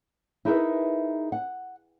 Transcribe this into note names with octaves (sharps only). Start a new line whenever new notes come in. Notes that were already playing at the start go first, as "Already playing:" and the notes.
D#4 E4 G#4 A#4 B4 E5
F#5